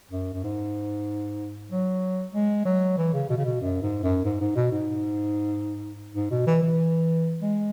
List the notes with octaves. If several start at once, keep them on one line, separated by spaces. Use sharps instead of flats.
F#2
F#2
G#2
F#3
G#3
F#3
E3
C#3
B2
C#3
B2
F#2
G#2
F#2
G#2
G#2
B2
G#2
G#2
B2
E3
E3
G#3